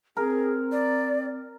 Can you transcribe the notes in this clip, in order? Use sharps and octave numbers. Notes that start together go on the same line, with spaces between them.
C4 G#4 A#4
D5